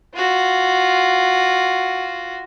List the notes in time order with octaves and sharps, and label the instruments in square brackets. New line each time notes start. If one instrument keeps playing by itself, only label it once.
[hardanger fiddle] F4 F#4